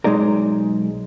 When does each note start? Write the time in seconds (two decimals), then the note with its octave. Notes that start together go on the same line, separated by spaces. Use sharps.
0.04 B1 C3 G#3 D#4 D5 A#5